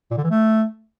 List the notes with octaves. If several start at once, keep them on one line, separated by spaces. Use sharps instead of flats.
A#2
D3
E3
A3